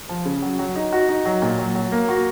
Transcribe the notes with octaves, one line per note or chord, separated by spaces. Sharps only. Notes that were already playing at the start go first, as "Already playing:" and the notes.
F3
C#3
F#3
F#3
D#4
F#4
D#4
F#3
A#2
F#3
F#3
A#3
F#4